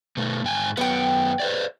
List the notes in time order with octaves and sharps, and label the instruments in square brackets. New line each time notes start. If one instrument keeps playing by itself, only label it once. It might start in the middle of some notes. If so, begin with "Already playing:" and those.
[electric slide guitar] B2 A3
G#2 G5 G#5
[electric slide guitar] F#2 B3 B4 [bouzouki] F#5 G5
[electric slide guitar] B4 C5 D5